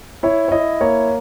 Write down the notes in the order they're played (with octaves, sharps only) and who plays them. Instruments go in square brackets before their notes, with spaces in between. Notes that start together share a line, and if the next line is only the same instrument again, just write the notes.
[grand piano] E4 C#5
C#5
E4 D#5
A#3 C#5